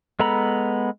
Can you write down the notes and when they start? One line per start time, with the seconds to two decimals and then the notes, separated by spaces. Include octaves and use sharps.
0.20 G#3 B3 A4 A#5 B5